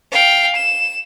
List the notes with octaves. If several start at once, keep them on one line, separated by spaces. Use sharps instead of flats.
F5 G5
E7